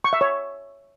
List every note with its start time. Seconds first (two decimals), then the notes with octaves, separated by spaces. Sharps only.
0.04 C#6
0.13 E5
0.21 C#5